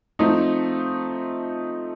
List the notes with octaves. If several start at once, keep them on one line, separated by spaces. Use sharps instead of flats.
F3 A3 C4 D#4